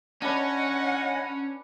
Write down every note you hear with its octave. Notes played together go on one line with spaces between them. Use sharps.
C#4 D4 B4 C#5 D#5 F#5 G#5